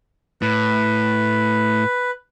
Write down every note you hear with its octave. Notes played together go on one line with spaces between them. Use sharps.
A2 B4